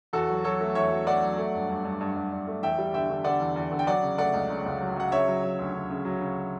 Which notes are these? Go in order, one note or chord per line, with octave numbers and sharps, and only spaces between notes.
E2 F#4 A4
F#3
F#3 A4 C#5
A3
E2 C#5 E5
F#3
A3 D5 F#5
F#3
A3
G2
G2
G2
G2
G2
G2
A3
E2 E5 G5
G3
D3 E5 G5
D3
D3 D5 F#5
E2
E2
D3
G5
F#3 D5 F#5
C#3
A3 D5 F#5
C#2
C#3
C#2
F#3
F#3 F#5
C#3 C#5 E5
F#3
F#3
D2
D2
C#3
F#3
C#3